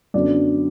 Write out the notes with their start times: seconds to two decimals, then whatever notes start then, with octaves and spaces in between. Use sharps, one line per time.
0.14 F#2 D3 F#3 B3 D4 D5